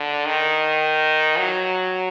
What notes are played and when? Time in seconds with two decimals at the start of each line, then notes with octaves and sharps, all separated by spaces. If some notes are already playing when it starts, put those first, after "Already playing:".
Already playing: D3
0.26 D#3
1.38 F#3